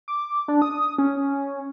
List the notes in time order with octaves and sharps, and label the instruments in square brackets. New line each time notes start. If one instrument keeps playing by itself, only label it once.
[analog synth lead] D6
D4
D#6
C#4